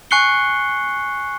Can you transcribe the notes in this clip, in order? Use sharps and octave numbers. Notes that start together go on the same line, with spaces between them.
G#5 C#6 F#6 C7 C#7 G7